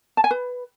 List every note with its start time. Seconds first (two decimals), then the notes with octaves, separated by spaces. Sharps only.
0.17 A5
0.24 G#5
0.31 B4